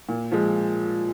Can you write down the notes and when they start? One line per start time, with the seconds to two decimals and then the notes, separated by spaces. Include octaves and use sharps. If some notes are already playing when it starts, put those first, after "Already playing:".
0.09 A#2
0.32 F3 G#3